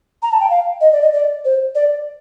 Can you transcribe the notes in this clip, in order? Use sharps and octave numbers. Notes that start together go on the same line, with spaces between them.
A#5
A5
G5
F5
D#5
D5
D#5
D5
C5
D5